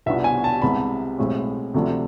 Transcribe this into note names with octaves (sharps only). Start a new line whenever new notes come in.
C2 B2 B3 D4 F4 E5
G#5
A5
C2 C3 G#3 B3 B5
B1 A2 G#3 C4
D2 C3 F3 A3 D4